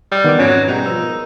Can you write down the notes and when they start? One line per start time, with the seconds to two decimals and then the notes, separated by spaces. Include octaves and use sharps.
0.12 G3 D#6 F#6
0.24 D#3 E3 B3 D6
0.39 F2 G#2 F#3 C#4
0.68 B2 G3 G#3 D#4
0.86 F3 B4 C5 E6
1.02 A#4